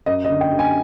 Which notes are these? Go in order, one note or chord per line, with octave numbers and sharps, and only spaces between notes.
F#2 D#5
D#5
D3
G5
D3
G#5